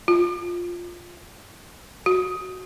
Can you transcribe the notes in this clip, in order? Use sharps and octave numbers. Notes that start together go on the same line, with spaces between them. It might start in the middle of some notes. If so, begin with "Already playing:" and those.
F4
F#4